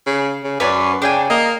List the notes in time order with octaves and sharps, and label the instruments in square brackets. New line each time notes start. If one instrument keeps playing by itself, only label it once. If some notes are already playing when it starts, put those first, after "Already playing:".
[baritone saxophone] C#3
C#3
[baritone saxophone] F#2 [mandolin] B4 C#5 D5
[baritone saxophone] C#3 [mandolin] D4 G5 G#5
[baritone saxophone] A#3 [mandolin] D#5